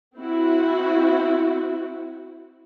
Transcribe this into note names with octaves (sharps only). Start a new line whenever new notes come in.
C4 E4 F#4